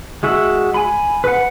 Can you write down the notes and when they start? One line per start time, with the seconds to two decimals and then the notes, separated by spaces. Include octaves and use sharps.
0.23 G#3 F#4 E5
0.74 G#5 B5
1.24 B4 F#5